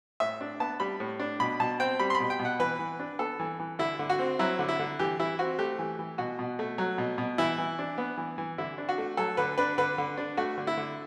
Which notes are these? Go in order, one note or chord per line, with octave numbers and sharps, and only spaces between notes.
A2 E5
D4
B3 A5
G3 B5
A2
D4
B2 B5
B2 A5
C4 G5
G3 B5
C6
B5
B2
G5
B2
F#5
E3 B4
E3
D4
B3 A4
E3
E3
D3 E4
D3
F#4
C4
F#3 E4
D3
E4
D3
E3 G4
E3 E4
C4 F#4
A3 G4
E3
E3
B2 F#4
B2
A3
F#3
B2
B2
E3 E4
E3
D4
B3
E3
E3
D3 E4
D4
F#4
A3
F#3 A4
D3 B4
D4 B4
D3 B4
D3
D4
A3 F#4
D3
E4
D3